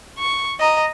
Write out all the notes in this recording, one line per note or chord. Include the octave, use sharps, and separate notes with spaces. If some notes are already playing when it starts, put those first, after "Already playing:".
C#6
D#5 A#5